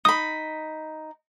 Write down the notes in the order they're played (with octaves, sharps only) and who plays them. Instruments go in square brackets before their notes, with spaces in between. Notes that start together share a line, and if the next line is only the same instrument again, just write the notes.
[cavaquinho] D#4 B5 [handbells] D#6